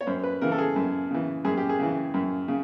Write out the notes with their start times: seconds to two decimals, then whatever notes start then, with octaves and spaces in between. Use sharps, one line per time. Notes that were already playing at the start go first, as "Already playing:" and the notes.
0.01 C#5
0.07 F#2 C5
0.23 B4
0.41 C#3 E3 A#4
0.52 A4
0.58 G#4
0.76 F#2
1.11 C#3 E3
1.45 F#2 G#4
1.57 G4
1.69 G#4
1.79 C#3 E3
2.14 F#2
2.48 C#3